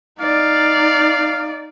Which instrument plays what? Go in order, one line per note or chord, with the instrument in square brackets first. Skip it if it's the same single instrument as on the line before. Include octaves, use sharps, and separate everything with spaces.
[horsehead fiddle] D#4 D5 [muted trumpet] F5